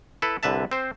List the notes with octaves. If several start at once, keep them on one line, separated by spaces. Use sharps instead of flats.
E4 A4 B4
C2 D3 B4 E5 A5
C4 C5